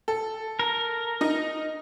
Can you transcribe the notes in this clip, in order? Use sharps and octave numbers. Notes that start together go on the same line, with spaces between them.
A4
A#4
D#4 D#5